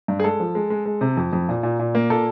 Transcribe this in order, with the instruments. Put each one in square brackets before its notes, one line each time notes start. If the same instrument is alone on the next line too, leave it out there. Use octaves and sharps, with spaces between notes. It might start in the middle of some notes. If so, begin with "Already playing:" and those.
[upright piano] G2
G#4
G#3 A4
F3
G#3
G#3
G#3
C3
F2
F2
A#2
A#2
A#2
A#3
A#2 A4